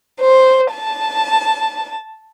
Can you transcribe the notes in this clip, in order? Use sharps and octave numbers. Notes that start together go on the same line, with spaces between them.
C5
A5